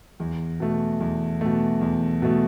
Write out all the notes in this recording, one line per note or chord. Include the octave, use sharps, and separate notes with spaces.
E2
B2 A3
E2
B2 A3
E2
B2 A3